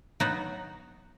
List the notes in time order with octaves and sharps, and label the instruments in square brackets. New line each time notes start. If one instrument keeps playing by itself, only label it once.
[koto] F#3 B3 D#4 F#4